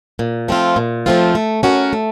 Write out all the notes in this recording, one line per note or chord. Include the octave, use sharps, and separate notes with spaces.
A#2
F3 A3 C4 F4
A#2
F3 A3 C4 F4
A3
C#4 F#4 A#4
A3